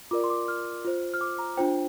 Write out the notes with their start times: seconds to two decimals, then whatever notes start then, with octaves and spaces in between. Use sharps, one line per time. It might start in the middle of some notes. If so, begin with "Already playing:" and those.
0.11 F4 A#4 D5 D6
0.24 C6
0.30 D6
0.48 F6
0.85 F4 C5
1.14 F6
1.21 D6
1.39 A#5
1.57 D4 F4 C5 G5